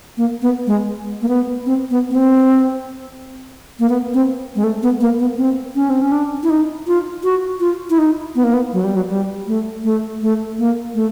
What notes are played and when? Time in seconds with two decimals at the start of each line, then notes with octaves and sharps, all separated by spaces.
0.17 A#3
0.42 B3
0.67 G#3
1.22 A#3
1.29 B3
1.66 C4
1.91 B3
2.10 B3
2.15 C4
3.79 A#3
3.89 B3
4.14 C4
4.56 G#3
4.64 A3
4.83 B3
5.01 A#3
5.19 B3
5.38 C4
5.75 C#4
5.90 C4
6.01 C#4
6.12 D4
6.43 E4
6.50 D#4
6.87 F4
7.24 F#4
7.60 F4
7.90 E4
7.98 D#4
8.35 B3
8.44 A#3
8.54 B3
8.73 F#3
8.84 G3
8.96 F#3
9.10 G3
9.47 A3
9.84 A3
10.22 A3
10.59 A#3
10.95 A3